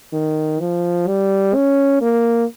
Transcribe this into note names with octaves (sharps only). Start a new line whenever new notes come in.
D#3
F3
G3
C#4
A#3